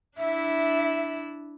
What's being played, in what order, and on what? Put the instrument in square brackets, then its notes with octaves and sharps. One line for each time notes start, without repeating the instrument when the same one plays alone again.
[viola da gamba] D4 E4 [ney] E5